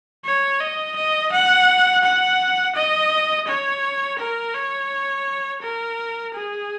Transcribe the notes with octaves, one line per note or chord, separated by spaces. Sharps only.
C#5
D#5
D#5
F#5
F#5
D#5
C#5
A#4
C#5
A#4
G#4